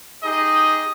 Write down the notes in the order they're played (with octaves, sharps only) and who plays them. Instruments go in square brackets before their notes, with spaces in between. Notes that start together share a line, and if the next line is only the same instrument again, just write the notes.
[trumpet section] D#4 G4 G#4 D#5